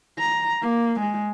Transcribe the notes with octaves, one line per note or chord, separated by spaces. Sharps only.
A#5
A#3
G#3